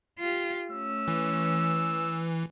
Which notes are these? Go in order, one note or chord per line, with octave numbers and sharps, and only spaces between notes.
F4 G4
A3 C#4 E6
E3